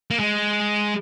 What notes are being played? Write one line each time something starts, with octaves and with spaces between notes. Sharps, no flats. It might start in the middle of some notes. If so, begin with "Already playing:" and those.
A#3
G#3